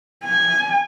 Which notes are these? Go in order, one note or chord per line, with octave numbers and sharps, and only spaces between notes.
G#5